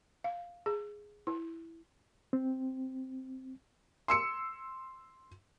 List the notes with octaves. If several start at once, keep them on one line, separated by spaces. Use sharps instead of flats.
F5
G#4
E4
C4
C6 E6 C#7